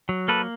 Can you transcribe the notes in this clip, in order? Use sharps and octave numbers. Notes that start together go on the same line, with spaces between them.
F#3
A#3 A4 B4